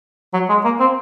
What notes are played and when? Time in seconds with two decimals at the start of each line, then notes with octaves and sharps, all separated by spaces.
0.34 F#3
0.49 G#3
0.65 A#3
0.80 C4